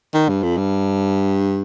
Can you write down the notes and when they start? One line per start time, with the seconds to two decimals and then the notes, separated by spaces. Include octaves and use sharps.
0.14 D#3
0.28 G2
0.42 F2
0.57 G2